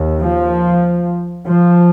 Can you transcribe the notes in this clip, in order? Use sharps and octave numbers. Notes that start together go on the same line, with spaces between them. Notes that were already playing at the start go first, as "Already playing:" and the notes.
Already playing: D#2
F3
F3